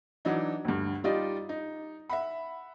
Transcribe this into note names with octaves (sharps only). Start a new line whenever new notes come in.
E3 F#3 D4 D#4
D2 G2
G3 D#4 F4 G4 D5 D#5
D#4
E5 F#5 B5